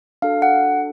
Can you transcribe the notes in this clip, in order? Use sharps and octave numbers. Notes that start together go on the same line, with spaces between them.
D4 F#4 A4 F5
F#5